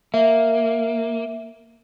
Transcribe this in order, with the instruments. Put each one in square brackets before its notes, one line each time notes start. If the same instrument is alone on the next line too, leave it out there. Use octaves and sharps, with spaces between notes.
[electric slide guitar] A#3 [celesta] E5